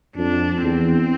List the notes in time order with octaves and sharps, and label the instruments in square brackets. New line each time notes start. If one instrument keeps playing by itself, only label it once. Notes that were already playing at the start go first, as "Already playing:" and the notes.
[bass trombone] F2 [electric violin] D4
[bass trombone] E2 [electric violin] C4